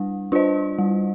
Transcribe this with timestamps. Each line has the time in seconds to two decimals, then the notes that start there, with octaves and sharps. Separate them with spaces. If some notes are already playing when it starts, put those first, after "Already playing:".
Already playing: G3 D4
0.32 D4 F4 C5 D#5
0.79 G3